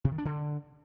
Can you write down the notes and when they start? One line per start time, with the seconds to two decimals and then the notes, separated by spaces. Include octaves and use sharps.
0.04 C3
0.11 D#3
0.18 D4
0.25 D3